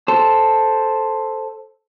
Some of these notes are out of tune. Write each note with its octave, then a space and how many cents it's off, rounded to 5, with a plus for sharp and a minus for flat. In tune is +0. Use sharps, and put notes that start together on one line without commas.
A4 +0 C5 +0